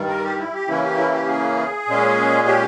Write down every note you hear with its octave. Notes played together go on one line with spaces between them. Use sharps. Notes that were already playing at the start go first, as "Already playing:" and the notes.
Already playing: G2 D#3 G3
A#4
G4
E4
G4
C#3 E3 A#3 C#4 E4
G4
E4
G4
G#4
A#2 G#3 C#4
G4